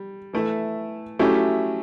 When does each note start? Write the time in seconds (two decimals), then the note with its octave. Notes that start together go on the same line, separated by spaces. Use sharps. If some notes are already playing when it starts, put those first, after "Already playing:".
Already playing: G3
0.33 E3 A3 E4
1.19 F#3 A3 C#4 E4 G4